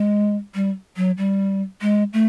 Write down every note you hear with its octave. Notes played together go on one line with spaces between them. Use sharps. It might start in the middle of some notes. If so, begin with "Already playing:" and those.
Already playing: G#3
G3
F#3
G3
G#3
A3